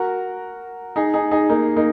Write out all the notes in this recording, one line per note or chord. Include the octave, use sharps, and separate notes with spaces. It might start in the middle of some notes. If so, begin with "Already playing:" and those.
Already playing: F#4 A#4
D#4 G#4
D#4 G#4
D#4 G#4
A#3 D#4
A#3 D#4